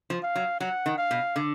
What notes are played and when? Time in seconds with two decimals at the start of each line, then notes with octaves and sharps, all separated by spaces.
0.10 F3
0.23 F5
0.35 F#3
0.60 F#3 F#5
0.86 D#3
0.98 F5
1.11 B2
1.36 D3